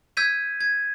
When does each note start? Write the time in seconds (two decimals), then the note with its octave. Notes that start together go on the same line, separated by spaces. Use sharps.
0.17 E6 G6 G#6 B6 D#7
0.61 G#6